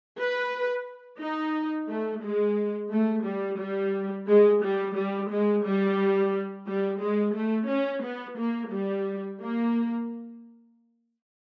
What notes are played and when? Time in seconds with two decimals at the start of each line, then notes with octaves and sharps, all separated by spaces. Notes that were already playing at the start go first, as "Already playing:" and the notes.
0.18 B4
1.20 D#4
1.89 A3
2.23 G#3
2.91 A3
3.26 G3
3.60 G3
4.28 G#3
4.63 G3
4.96 G3
5.31 G#3
5.65 G3
6.67 G3
7.01 G#3
7.36 A3
7.70 C#4
8.04 B3
8.38 A#3
8.72 G3
9.41 A#3